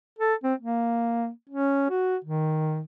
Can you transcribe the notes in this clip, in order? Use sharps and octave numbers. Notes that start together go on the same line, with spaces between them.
A4
C4
A#3
C#4
F#4
D#3